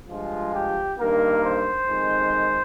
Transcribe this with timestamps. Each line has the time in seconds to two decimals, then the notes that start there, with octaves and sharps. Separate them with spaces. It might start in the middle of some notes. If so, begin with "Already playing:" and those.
0.08 G2 F3 G#3 F4
0.54 G4
0.98 G2 D#3 A#3 A#4
1.43 C5
1.88 F2 D#3 G#3